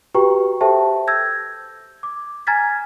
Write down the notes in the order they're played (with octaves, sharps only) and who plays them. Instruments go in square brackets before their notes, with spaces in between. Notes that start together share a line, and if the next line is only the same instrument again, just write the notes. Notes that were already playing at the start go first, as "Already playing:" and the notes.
[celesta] F#4 G4 B4 G5 A#5 C#6
G4 A4 C5 E5 G5 A5
E6 G6 G#6 A#6
D6
G#5 A#5 F6 G#6 A6 B6